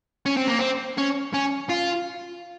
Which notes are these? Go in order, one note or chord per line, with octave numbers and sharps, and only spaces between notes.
C#4
C4
A#3
C4
C#4
C#4
F4